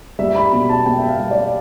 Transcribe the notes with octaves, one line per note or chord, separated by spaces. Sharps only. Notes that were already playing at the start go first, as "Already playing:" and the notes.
G3 E5
B5
B2
A5
B2 G5
E5
F5
G3
D5